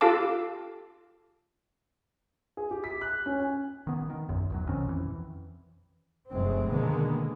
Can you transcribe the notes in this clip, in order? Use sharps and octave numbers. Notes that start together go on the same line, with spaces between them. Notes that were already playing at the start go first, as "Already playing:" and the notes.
F4 G4 A4 F5 A5 D6
G#4
G4
B6
F#6
C#4
G#5
D#3 B3
D#3
A#1 F#2
A#1 E2 F#3
B2 D#3 C4 C#4
F2 E3
F1 F#2 G#3 C4
B2 D3 D#3 G#3 A#3 B3